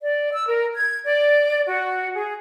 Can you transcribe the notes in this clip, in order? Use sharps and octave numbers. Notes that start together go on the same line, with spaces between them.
D5
E6
A#4
G#6
D5
F#4
G#4